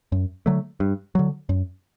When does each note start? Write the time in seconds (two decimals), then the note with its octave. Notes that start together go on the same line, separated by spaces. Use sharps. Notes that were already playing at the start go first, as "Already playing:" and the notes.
0.12 F#2
0.46 D3 F#3 A3
0.80 G2
1.15 D3 F#3
1.49 F#2